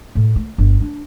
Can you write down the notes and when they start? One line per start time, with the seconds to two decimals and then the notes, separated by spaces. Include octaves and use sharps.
0.15 A2
0.36 A3
0.58 G1
0.80 D4